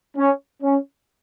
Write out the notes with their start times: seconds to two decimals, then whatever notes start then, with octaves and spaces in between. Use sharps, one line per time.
0.17 C#4
0.63 C#4